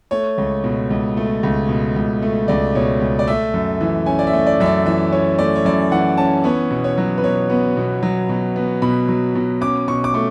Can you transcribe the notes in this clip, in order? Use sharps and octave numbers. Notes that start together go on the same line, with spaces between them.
A3 C#5
C#2
B2
C#2
A3
C#2
B2
C#2
A3
C#2 D5
B2 C#5
C#2
D5
A3 E5
F#2
E3
C#4 G#5
D5
E5
A3
D5
F#2 E5
D5
E3 E5
C#4 C#5
A3 D5
C#5
F#2 D5
E3 F#5
C#4 A5
B3 C#5
B2
C#5
F#3
B4
B2 C#5
B3
B2
F#3
B2
B3
B2 B5
F#3
B2
C#4 D6
B2 C#6
D6
A3 C#6